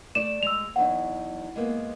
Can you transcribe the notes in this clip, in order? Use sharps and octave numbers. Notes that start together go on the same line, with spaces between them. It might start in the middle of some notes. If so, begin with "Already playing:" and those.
A3 D5 E7
G#3 E6 F7
E2 F#3 D#4 F#5
G#3 A#3 B3